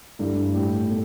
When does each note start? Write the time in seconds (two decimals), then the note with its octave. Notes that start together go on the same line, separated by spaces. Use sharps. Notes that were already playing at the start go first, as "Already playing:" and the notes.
0.19 G2 D3 A3 E4
0.54 A2 G3 E4 G4
0.89 B2 A3